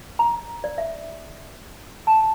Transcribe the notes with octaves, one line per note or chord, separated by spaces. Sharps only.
A#5
D5
E5
A5